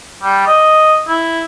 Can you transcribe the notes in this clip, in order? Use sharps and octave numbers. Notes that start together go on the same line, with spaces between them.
G3
D#5
E4